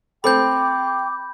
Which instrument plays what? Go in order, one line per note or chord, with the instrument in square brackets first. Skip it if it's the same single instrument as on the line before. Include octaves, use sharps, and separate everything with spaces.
[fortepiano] C4 A4 [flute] G5 [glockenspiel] B5 G6 [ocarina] D6